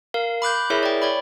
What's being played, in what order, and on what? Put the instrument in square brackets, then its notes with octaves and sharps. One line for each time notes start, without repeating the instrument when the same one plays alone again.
[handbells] A#4 F5
B5 D6 F#6 G6
E4 G#4 A#4 C#5 E5
D5 G5
C#5 D5 B5